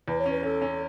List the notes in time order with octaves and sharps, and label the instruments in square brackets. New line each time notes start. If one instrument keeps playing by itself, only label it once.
[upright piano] E2 [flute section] B4
[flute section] C#5
[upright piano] C#4 [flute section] B4
[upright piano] C#4 [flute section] A4
[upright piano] C#4